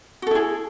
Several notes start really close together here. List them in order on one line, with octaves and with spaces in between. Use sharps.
F#4 A4 E4 G#4